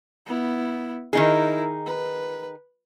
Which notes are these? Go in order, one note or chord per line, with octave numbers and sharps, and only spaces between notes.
B3 E4
D#3 D#4 E4 G#4 A#4
B4